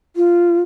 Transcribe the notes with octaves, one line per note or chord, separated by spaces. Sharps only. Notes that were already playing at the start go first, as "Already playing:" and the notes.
F4